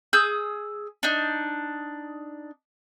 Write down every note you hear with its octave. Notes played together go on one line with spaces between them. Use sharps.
G#4 D#6 E6 G6
D4 D#4